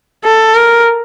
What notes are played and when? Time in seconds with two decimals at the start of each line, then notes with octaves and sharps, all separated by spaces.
0.24 A4
0.55 A#4